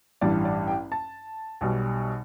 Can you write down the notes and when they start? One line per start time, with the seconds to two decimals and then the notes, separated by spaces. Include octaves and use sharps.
0.21 A1 G2 E3 G3 D5
0.45 D5
0.68 G5
0.92 A5
1.61 B1 B2 G3